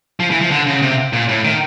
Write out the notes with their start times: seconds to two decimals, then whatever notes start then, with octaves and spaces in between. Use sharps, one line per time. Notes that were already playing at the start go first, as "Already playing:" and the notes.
0.20 F3
0.30 E3
0.41 F3
0.51 D3
0.67 C#3
0.82 C3
1.13 A#2
1.29 A2
1.45 D#3